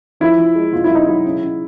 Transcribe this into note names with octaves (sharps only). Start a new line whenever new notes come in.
F3 E4
F3
G#3
B2 F4
E4
F#3
D#4
F#3 E4
C#3
C#3